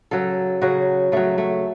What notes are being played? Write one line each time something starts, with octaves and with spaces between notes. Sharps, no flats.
C#3 F#3 A4
C#3 F#3 F#4
C#3 F#3 A3
A3